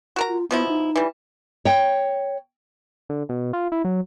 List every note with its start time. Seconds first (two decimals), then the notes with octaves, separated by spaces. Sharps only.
0.16 F#4 A#4 A#5
0.28 F4
0.51 B2 F3 B3 E4
0.68 D#4
0.96 E3 G3
1.65 C#5 G5
3.09 D3
3.29 B2
3.53 F4
3.72 E4
3.84 F#3